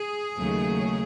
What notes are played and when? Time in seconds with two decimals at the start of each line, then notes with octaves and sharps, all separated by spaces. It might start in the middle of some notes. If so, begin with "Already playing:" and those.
Already playing: G#4
0.37 D#2 C#3 F#3 A3